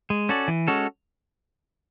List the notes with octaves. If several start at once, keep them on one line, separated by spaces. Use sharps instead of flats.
G#3
C#4 F#4 A4 D5
E3
G#3 C#4 F#4 A4